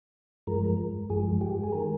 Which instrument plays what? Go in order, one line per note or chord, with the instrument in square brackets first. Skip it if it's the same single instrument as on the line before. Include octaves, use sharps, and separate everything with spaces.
[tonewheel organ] G2 F3 G#3 A#4
G2 F3 G#3 G#4
G4
G#4
D#3 G#3 A#4